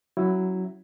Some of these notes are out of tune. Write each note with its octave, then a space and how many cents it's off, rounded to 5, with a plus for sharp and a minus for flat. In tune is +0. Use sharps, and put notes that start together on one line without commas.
F#3 +5 C#4 +0 E4 +5